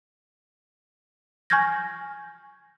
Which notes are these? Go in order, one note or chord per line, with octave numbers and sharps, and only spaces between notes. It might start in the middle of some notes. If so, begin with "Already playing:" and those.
G#5 C#6 F6 G6 G#6 A#6